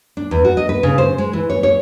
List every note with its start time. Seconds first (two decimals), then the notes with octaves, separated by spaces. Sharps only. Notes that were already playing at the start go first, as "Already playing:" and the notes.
0.17 D4
0.31 E2
0.45 F#4
0.57 D#5
0.69 B4
0.83 C#3
0.98 C5
1.18 G#3
1.33 E3
1.50 C#5
1.63 C#5